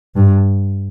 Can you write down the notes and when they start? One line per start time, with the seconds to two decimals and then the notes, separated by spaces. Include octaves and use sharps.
0.16 G2